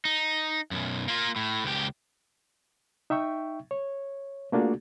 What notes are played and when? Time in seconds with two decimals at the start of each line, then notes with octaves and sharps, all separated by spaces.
0.05 D#4
0.71 B1 F#2
1.08 A#3 F4
1.36 A2
1.64 C#2 G4
3.10 D#4 E5 G5 C#6
3.71 C#5
4.52 A3 A#3 D4 F4 F#4 G#4